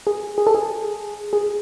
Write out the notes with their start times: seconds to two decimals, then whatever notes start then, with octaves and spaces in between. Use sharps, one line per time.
0.07 G#4
0.38 G#4
0.47 A4
0.55 G#4
1.33 G#4